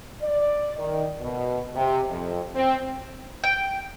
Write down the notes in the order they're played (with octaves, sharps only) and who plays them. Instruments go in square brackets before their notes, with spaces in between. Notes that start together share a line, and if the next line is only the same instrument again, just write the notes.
[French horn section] D5
D#3
B2
C3
F2
C4
[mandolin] G5